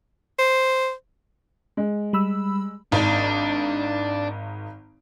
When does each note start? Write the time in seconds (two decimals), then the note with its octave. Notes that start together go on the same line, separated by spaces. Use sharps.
0.39 C5
1.77 G#3
2.13 G3 B5 E6
2.92 G#1 D4 D#4